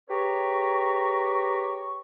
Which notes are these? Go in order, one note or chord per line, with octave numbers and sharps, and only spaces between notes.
G4 G#4 B4 C#5 A#5 C#6